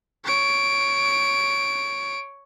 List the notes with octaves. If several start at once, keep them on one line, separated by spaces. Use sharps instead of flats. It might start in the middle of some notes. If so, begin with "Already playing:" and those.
C#5 D7